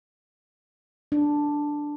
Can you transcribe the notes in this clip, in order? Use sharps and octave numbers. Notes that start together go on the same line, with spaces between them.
D4